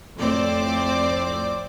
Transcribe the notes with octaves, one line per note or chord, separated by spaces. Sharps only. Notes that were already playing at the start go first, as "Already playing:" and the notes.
F2 A2 C4 C5 D5 D6